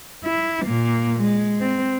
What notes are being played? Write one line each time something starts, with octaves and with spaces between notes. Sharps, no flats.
E4
A#2 A#3
G#3
C4